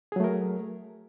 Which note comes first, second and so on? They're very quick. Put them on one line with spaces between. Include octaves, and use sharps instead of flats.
G#4 F#3 A3 A#4